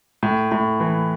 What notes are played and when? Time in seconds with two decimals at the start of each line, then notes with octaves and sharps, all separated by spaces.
0.23 A2
0.52 A2
0.80 E3